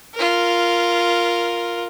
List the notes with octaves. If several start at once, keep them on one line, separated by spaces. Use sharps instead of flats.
F4 A#4